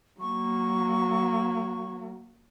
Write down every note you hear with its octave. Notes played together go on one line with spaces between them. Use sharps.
F#3 A#3 C#6